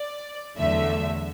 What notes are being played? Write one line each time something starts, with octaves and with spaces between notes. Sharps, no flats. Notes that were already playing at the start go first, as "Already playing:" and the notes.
Already playing: D5
E2 D3 F#3 A3 E5